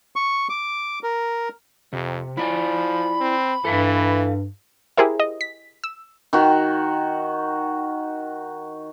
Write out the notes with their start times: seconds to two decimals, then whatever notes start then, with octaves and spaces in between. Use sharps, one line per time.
0.16 C#6
0.50 D6
1.03 A#4
1.93 F2 C3
2.37 F3 E4 D5 G#5 B5
3.21 C4
3.65 G2 E3 A4 E5 F5
4.97 E4 G4 G#4 A#4 C5 E5
5.20 D#5
5.41 B6
5.84 E6
6.33 D#3 F#4